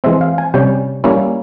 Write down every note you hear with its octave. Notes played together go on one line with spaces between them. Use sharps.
E3 G#3 C4 E5
F5
G#5
C3 G3 C#4 G5
G3 A#3 C#4 E4